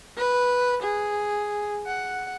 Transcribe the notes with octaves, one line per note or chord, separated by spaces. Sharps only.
B4
G#4
F#5